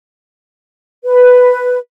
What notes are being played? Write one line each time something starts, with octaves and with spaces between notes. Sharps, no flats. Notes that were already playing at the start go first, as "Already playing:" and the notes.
B4